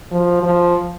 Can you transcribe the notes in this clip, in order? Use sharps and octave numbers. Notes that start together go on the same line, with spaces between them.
F3
F3